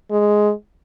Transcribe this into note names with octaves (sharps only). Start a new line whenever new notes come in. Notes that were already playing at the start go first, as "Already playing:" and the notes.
G#3